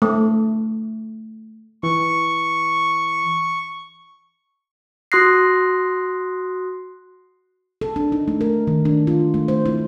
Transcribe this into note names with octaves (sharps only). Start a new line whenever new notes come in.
A3
E3 C#6
F#4 C6 D#6 F#6 A#6 C7
A4
D4
D#4
A3
A#4
D#3
D4
F4
A3
C5
E4